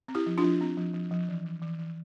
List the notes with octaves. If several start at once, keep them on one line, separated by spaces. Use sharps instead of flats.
C4
E4 G4
F3
D4 F4
F3
C4
F3
F3
F3
E3
E3
E3
E3